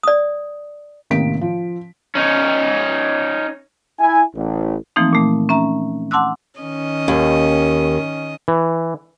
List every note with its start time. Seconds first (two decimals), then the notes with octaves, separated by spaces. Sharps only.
0.03 D5 D#6
1.10 A1 C3 D#3 A#3 B6 D7
1.41 F3
2.15 C#4 D#4
3.99 E4 G#5
4.34 A1
4.96 E3 F3 A3 A#3 C4 D#4
5.13 A#2 A3
5.49 C#4 E5 A#5
6.11 F#5 A5 C6 D6 E6 F#6
6.61 D#3 C#4 D#5
7.08 D#2
8.48 E3